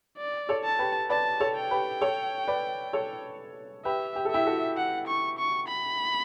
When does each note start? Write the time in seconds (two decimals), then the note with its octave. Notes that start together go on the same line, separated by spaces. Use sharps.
0.18 D5
0.49 A4 C#5
0.64 A5
0.79 G4 B4
1.09 B4 D5 A5
1.40 A4 C#5
1.56 G5
1.71 G4 B4
2.01 A4 C#5
2.47 B4 D5
2.93 A4 C#5
3.85 G4 B4 E5
4.16 G4
4.25 A4
4.31 E4 G4 E5
4.46 F#4 A4
4.77 F#5
5.08 C#6
5.38 C#6
5.68 B5